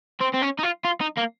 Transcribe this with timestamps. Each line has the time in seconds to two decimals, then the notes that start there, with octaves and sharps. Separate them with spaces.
0.20 C4
0.34 C4
0.42 C#4
0.59 D#4
0.63 F4
0.84 F4
1.01 D#4
1.17 A#3